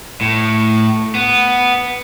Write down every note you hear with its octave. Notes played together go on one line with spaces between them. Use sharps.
A2
B3